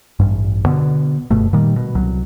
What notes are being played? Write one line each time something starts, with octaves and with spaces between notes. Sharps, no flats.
A1 G2
B2 D3 B3
F#1 G2 B2 A3
A#2 D#3 G3
B2
C2 F#3